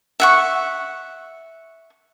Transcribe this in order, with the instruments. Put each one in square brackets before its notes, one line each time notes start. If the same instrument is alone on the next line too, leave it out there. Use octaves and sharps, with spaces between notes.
[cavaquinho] E5 F#5 C#6